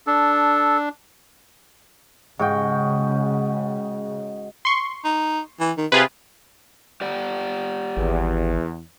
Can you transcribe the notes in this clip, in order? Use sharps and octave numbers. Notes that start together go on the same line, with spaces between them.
D4 A4
G#2 C#3 F#4 G5
C6 C#6
D#4
E3
D#3
C3 F4 G#4 B4
G4 D5 F#5
G#1 E2